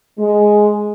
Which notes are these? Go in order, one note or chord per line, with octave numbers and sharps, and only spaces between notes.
G#3